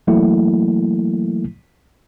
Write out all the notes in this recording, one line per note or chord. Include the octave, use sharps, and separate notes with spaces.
E3 F#3 A3 A#3 E4